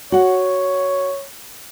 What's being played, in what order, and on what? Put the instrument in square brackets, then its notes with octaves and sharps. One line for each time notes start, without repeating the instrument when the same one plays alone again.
[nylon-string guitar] F#4 F#5 [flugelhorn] C#5